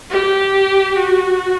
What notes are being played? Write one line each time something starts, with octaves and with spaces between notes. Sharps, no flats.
G4
F#4